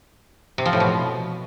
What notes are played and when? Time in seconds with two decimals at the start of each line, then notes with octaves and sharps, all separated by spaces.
0.58 C3
0.66 F3
0.73 A2
0.80 B2